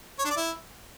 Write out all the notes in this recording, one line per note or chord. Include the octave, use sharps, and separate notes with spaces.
C#5
D4
D5
E4